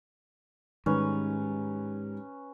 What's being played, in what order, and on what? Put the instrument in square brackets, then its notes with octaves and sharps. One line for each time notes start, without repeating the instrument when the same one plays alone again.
[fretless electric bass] G#2 [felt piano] D#3 G3 [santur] C#4 B4